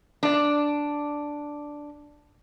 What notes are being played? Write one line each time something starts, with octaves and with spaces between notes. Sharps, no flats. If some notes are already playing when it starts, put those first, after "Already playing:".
D4 D5